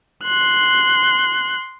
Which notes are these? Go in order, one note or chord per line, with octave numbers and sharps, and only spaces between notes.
C6 F#6